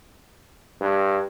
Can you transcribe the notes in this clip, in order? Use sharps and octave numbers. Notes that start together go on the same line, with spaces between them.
G2